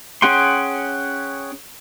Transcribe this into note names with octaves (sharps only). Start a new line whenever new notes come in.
C#4 G#4 F#5 G5 C6